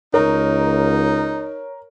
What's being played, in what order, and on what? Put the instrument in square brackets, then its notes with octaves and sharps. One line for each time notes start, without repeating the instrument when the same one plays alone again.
[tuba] C#2 [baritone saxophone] D#4 [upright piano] A#4 [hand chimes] C#5